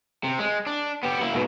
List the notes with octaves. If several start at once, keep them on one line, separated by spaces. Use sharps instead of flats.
C3
G#3
D4
B3 G4
A#3 E4
G#2 B2